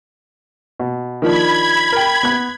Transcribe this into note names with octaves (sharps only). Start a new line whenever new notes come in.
B2
D#3 F3 D4 B5 G#6
A#4 G5
B3 F#6